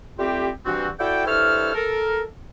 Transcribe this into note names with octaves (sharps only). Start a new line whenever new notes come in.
G3 A3 C4 F4 G4
G2 E3 C4 F#4
E4 F#4 A4 D5 G5
G2 E4 A4 C5 C#5 F6
A4 A#4